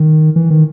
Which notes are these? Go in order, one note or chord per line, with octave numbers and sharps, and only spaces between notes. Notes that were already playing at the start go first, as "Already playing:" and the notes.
Already playing: D#3
E3
D#3